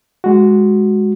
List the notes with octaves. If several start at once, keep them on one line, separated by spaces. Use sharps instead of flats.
G#3 F#4